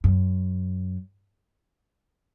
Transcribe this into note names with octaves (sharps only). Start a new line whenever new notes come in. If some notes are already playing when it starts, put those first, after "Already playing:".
F#2